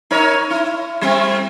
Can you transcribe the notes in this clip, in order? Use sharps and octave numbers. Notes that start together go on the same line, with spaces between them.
D#4 A#4 C#5
E4
G3 A3 C4